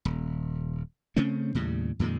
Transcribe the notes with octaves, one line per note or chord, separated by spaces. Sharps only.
D#1
C#3 A3 C4 C#4
D#2 A2 C#3 G3
F2 A#2 D#3 G#3